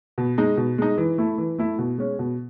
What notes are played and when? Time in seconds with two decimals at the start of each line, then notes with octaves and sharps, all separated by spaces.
0.18 B2
0.38 G#3 D#4
0.57 B2
0.78 G#3 D#4
0.98 E3
1.18 A3 E4
1.38 E3
1.58 A3 E4
1.79 B2
1.98 G#3 C#4
2.19 B2